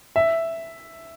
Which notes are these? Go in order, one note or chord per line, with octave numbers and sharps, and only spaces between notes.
E5